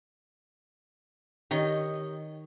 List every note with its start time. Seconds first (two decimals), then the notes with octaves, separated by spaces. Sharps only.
1.51 D#3 G4 C#5 D#5